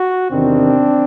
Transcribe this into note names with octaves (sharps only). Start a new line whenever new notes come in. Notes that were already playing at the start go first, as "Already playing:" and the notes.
Already playing: F#4
E2 C3 D#3 C4 D4